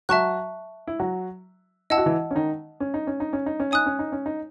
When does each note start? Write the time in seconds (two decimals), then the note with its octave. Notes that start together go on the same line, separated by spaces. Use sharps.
0.09 F#3 F#4 E5 A5 C#6 F#6
0.87 E4
0.99 F#3 F#4
1.90 E4 D#5 F#5 A5 E6
1.98 F#4
2.06 E3 E4
2.31 C#4
2.35 D#3 D#4
2.80 C#4
2.94 D#4
3.07 C#4
3.20 D#4
3.33 C#4
3.46 D#4
3.60 C#4
3.71 D#4 C#5 G#5 D#6 F#6
3.86 C#4
3.99 D#4
4.12 C#4
4.26 D#4